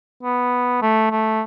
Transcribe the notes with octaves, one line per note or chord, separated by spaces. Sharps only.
B3
A3
A3